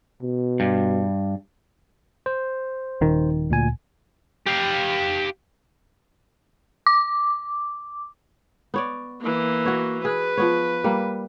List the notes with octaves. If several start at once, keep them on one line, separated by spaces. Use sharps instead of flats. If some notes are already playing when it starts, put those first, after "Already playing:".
B2
G2
C5
D#1 D#3
D2 A#2 G#5
G4 F5
D6
B3 C#5 D5
E3 A#3
F#4 C#5
G#4 B4
F3 B3 C#5
G3 A#3